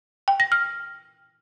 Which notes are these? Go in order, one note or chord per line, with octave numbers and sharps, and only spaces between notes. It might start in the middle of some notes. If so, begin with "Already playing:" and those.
G5
A#6
F6